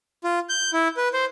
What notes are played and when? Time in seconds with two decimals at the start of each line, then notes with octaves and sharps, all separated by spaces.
0.24 F4
0.49 G6
0.73 E4
0.97 B4
1.13 C5